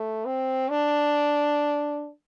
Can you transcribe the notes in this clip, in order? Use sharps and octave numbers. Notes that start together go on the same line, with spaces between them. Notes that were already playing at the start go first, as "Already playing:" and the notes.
Already playing: A3
C4
D4